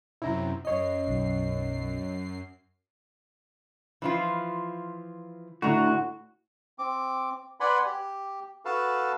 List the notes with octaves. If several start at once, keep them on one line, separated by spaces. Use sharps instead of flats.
F#2 C3 E4 A#5
F#2 C#5 D#5 C7
B1
E3 F3 F4
A2 D3 F#4 A#5
C4 D6
B4 D5 F#5 G#5 B5 C6
G4
F#4 A4 B4 F5 A5